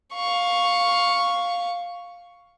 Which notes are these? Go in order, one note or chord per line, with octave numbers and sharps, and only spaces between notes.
F5 C#6